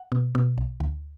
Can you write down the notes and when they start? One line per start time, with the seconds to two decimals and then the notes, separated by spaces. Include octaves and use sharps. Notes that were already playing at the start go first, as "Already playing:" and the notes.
Already playing: F#5
0.12 B2
0.35 B2
0.58 B1
0.80 D2